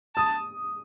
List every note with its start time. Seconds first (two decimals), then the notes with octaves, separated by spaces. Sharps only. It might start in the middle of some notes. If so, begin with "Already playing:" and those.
0.16 A5 D#6